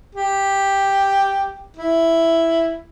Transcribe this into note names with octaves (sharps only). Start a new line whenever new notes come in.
G4
E4